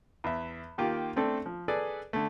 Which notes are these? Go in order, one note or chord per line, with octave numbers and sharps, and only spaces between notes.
E2 E5
D#3 A#3 F4 G4
A3 C4 D4 A4
F3
G#4 A4 B4 D5
D3 A3